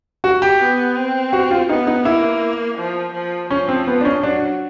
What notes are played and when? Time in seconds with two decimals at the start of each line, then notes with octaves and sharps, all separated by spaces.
0.24 F#4
0.42 G4
0.60 B3
0.96 C4
1.33 F#4
1.51 F4
1.69 B3 D#4
1.87 D#4
2.05 A#3 E4
2.78 F3
3.14 F3
3.50 F3 C#4
3.68 C4
3.87 B3
4.01 D4
4.05 C#4
4.23 F#3 D4